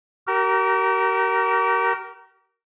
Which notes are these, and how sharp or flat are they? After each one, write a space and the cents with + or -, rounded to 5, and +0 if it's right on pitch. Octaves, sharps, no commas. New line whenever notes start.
G4 -45 A#4 +0